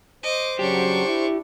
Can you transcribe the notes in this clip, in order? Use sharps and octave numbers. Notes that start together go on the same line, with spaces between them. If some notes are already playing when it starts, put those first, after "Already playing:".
C5 D#5 D6
G2 C#3 F#3 D4 G4 C#6
E4